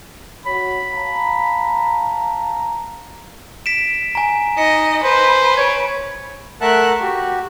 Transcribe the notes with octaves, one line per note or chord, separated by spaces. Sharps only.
F#4 C#5 B5
F5 A5 A#5
B6 D7 E7
G#5 A#5
D#4 D#5 C#7
B4 C5
C#5 G#6 D7
A3 A#4 E5 F#5 A5 F#6
F#4 G4